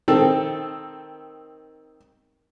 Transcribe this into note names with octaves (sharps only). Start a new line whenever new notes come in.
D#3 C4 A4